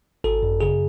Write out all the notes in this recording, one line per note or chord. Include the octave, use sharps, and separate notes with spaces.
G#1 A4
F#2
C#3 G#4